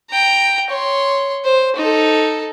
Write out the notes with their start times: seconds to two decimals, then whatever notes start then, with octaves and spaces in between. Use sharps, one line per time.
0.11 G5 A#5
0.70 C#5 C6
1.44 C5
1.76 D#4 A4